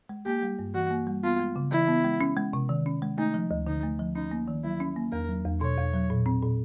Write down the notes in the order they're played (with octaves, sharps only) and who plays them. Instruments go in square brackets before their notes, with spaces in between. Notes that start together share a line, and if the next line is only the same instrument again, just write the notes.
[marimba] G#3
[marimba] A#3 [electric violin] G4
[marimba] G3
G2
[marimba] E3 [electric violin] F#4
[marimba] A#3
G3
[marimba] B3 [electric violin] F4
[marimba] G#3
C#3
[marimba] E3 [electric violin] E4
[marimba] B3
G#3
C#4
G#3
C3
D#3
C#4
G#3
[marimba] A3 [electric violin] D#4
[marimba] F3
D2
[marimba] D3 [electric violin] D#4
[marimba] A3
F3
[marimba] C#4 [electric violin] D#4
[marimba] A#3
D#3
[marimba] F#3 [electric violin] E4
[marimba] C#4
A#3
[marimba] E2 [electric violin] A#4
[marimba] F#3
E2
[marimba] B2 [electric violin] C#5
[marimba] E2
F#3
A#2
C4
A#2